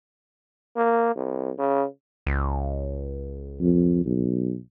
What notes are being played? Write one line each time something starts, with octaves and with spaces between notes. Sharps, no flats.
A#3
C2
C#3
C#2
F2
B1